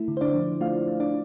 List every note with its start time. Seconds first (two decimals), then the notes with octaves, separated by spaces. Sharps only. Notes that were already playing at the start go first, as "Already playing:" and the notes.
Already playing: A3 E4
0.08 D3
0.17 C5
0.21 D4 D5
0.34 F3
0.61 A3 F4 F5
0.88 A3
1.00 D4 D5